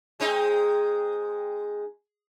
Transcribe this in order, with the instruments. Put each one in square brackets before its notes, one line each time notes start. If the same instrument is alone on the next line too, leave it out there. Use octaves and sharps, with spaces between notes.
[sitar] G#3 C4 D#4